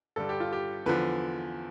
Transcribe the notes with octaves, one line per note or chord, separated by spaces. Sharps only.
G2 D3 G3 A4
G4
F4
G4
E2 D3 F3 B4